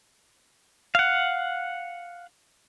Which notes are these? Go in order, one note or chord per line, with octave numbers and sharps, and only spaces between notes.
F5 F#5